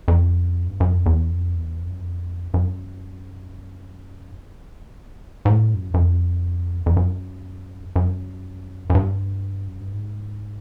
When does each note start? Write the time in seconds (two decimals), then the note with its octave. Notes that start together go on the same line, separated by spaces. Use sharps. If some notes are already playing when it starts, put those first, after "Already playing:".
0.08 F2
0.68 G2
0.80 F#2
0.93 F2
1.06 E2
1.31 F2
1.55 E2
1.79 F2
1.90 F#2
2.00 F2
2.54 F#2
5.45 G#2
5.49 A2
5.74 F#2
5.94 F#2
5.98 F2
6.86 F2
6.97 F#2
7.96 F#2
8.90 F#2
8.95 G2
9.68 F#2
9.80 G2
9.93 G#2